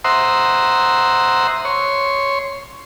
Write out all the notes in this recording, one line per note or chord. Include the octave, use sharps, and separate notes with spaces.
C5 E5 F#5 A#5 C6 D#6
C#5 C6